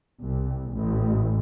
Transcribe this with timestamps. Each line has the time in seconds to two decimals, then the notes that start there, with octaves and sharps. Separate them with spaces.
0.20 C2
0.72 A1